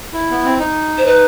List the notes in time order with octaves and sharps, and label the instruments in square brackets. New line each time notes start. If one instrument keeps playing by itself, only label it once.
[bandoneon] E4
B3
C4
D#4
[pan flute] C5
[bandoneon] D#4 [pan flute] B4